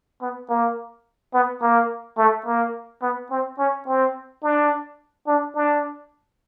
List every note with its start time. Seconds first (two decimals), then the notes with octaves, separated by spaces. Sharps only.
0.21 B3
0.49 A#3
1.33 B3
1.62 A#3
2.17 A3
2.46 A#3
3.02 B3
3.31 C4
3.59 C#4
3.87 C4
4.43 D4
5.27 D4
5.55 D4